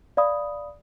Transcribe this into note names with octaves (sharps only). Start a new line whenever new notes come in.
D5 F5 B5 D#6